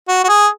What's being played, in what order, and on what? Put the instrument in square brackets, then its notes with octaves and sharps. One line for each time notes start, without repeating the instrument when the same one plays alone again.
[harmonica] F#4
F#4
G#4